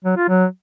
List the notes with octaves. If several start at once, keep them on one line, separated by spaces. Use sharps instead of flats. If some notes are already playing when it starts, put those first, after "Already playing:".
F#3
F4
F#3